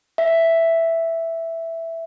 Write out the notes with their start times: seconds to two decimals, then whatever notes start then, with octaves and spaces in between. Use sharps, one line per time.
0.18 E5